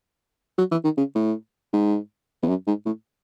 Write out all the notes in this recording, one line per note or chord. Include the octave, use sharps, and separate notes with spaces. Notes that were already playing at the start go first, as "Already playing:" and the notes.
F#3
E3
D#3
C#3
A2
G#2
E2
F#2
G#2
A2